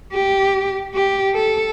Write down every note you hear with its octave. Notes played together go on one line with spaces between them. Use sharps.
G4
G4
A4